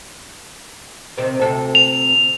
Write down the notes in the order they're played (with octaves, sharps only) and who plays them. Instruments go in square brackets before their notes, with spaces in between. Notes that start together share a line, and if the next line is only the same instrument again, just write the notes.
[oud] C3 D#3 C4
D2 C3 A4
[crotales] F7